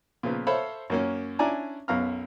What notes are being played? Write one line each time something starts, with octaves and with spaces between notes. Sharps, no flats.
A#2 C#3 F3 B3
A4 C5 C#5 E5 F5 B5
F#2 A#3 C#4
C#4 D4 E4 D5 G#5 A#5
B1 F#2 B2 F5 A#5 F6